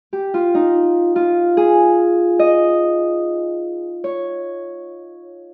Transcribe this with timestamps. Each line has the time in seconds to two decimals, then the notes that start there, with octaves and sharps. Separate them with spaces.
0.13 G4
0.34 F4
0.55 D#4
1.16 F4
1.57 G#4
2.39 D#5
4.04 C#5